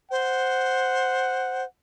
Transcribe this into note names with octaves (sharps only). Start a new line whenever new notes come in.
C5 F#5